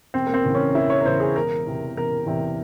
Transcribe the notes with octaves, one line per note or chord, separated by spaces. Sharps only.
E1 C4
A#3
C4
E2 C#3 E3
C#4
E1 E4
C#5
A#4
E2 C#3 E3 C5
G#4
E1 A#4
E2 C3
E1 A#4
E2 C3